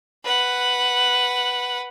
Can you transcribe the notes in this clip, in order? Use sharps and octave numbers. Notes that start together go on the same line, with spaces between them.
B4 F#5